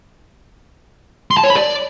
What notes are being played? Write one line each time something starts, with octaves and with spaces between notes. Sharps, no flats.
C6
A5
C#5
B5
D5